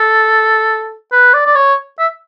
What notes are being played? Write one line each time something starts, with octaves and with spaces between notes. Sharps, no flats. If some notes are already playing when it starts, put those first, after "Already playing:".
Already playing: A4
B4
D5
D5
C#5
E5